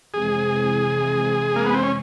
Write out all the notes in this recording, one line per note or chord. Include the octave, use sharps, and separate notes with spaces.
F2 C3 E3 G#3 C4 G#4
A#3
B3
C4
C#4